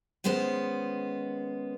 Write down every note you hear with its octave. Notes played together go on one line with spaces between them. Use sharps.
D#3 G#3 B3 C#4 C5